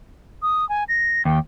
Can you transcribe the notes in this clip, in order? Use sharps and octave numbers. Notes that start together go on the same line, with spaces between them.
D#6
G#5
A#6
D#2 G5